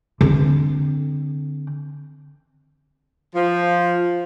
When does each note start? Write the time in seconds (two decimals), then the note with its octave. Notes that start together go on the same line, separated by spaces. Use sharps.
0.21 D3 C4
3.34 F3